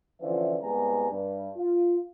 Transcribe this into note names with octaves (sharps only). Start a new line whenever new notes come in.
D3 E3 F3 C#4 F4 E5
C2 G#3 B3 G4 G#5 A#5
G2
F4